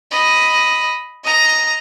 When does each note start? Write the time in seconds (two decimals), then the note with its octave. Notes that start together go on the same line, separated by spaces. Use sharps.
0.11 D#5 B5
1.24 D#5 A#5